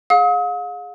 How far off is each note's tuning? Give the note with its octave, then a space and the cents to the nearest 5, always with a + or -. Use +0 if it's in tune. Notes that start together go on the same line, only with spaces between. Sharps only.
G#4 +0 F5 +40 D#6 +40